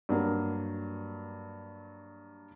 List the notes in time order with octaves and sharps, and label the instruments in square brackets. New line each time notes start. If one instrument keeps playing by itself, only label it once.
[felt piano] G2 F#3 A#3